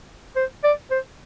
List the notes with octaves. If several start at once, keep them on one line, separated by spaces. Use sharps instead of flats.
C5
D5
C5